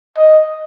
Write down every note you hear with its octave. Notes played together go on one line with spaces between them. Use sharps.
D#5